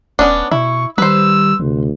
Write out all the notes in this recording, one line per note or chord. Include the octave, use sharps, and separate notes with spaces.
D#1 B3 C#4 D4
B2 E4 C#6
D#3 G3 B4 C5 E6
D2 C3